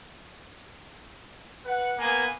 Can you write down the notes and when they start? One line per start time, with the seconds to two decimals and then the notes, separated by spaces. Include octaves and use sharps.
1.65 B4 F#5
1.99 A#3 B3 G#5